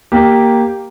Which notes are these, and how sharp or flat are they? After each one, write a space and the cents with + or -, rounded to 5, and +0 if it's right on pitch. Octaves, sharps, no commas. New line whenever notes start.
A#3 +0 G4 +0